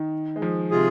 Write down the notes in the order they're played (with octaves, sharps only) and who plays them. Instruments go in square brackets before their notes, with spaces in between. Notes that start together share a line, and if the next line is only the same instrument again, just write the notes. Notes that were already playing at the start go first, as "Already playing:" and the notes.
Already playing: [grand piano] D#3
G#3
F3
[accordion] C3 G#3 F4 G#4